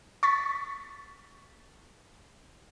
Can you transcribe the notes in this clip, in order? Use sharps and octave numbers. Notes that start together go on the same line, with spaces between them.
C#6 A6 B6